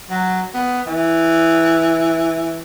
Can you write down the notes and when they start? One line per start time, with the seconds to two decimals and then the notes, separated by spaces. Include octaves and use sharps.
0.10 F#3
0.54 B3
0.87 E3